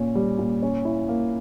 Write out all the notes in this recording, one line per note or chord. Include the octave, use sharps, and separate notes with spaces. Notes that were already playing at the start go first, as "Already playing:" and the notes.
Already playing: A#2 C#4
G3
A#2
C#4
E4
A#3